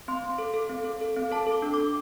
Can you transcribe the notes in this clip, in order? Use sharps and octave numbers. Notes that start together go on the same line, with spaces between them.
C4 C6
C4
A4
A4
C4
A4
A4
C4
A4 A5
A4
D6
D4
D4 D6